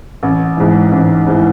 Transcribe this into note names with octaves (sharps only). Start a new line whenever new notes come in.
A1
G#2 E3
A1
G#2 E3